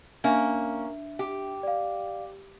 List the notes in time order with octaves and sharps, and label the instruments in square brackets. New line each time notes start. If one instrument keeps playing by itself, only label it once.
[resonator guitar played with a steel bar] A#3 C#4 [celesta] D4 E5
[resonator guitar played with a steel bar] G4
[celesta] D5 F5